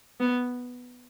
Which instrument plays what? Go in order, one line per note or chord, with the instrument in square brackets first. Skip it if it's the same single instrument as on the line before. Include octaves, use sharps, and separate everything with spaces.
[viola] B3